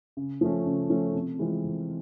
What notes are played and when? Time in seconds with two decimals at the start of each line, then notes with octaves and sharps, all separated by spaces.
0.17 C#3
0.41 F3 A3 C#4
0.66 C#3
0.90 F3 A3 C#4
1.15 C3
1.39 E3 G#3 C4 F4
1.64 C3